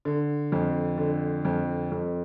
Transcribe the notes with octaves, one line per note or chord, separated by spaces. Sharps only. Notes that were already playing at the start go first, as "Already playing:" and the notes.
D3
F2
D3
F2
F2